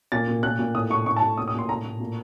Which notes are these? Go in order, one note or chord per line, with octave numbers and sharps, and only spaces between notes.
A#2 A6
A#2
A#2 F#6
A#2
A2 D#6
A2 C#6
A2 C#6
A5
A2
A#2 D#6
D#6
A#2
C6
A2 A#5
A2
A#2